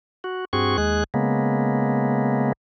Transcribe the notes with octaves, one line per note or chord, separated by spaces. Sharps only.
F#4
G2 C4 F#4 G#4 C#6
D#2 G#3 G#4 F#6
C#3 G#3 A#3 B3